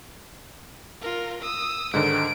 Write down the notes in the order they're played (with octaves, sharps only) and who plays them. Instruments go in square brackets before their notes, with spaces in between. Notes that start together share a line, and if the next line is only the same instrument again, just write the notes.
[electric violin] F4 A#4
D#6 E6
[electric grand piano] G#2 D3 D#3 [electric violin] D7